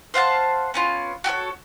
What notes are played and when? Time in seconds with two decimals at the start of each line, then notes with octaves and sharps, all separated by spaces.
0.14 C5 F5 F#5 A5
0.74 B3 C#4 F4
1.24 F#4 G4 A4 C#5